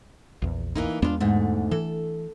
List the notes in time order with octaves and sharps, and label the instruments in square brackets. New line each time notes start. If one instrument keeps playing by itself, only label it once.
[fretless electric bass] A#1 E2
[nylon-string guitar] E3 A#3 D#4
[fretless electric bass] E2 G#3 B3 [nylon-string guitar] D4 F4
[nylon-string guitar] D2 G#2 A3
[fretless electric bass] E3 [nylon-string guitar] A4